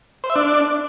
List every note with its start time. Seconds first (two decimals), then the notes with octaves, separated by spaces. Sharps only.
0.24 C5
0.30 E5
0.36 D4